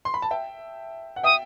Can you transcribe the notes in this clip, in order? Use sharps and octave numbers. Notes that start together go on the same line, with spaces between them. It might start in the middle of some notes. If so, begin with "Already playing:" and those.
C6
B5
A5
E5 G5
F#5
E5 G5 D#6